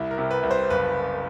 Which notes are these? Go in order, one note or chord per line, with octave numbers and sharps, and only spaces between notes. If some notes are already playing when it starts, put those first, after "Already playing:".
Already playing: C2 E4
A#4
C3
B4
C2
C5
F#1 B4